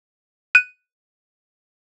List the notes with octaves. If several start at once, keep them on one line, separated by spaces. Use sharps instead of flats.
F#6 D#7